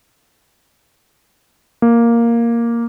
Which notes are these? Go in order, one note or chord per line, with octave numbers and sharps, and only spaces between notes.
A#3